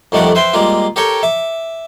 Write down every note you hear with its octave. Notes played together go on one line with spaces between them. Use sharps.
F2 D#3 G3 A3 D5 F#5
B4 C5 E5 G5 C6
G3 G#3 A#3 F4
G4 A4 A#4 C#5 G5 C#6
E5 D6